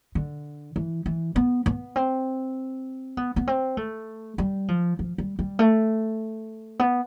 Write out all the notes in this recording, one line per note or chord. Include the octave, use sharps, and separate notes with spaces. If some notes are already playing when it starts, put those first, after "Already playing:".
D3
E3
E3
B3
B3
C4
B3
B3
C4
A3
G3
F3
F3
G3
G3
A3
B3